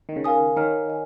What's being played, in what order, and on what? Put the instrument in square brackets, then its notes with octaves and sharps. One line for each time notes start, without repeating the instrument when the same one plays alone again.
[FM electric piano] D#3
C#3
[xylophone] A#4 F5 G#5 D#6
[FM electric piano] D#3 [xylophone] C#5 A#5 F6
[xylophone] D#5 G#5